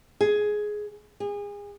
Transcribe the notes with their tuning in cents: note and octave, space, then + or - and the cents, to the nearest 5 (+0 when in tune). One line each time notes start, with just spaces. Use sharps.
G#4 +10
G#4 -30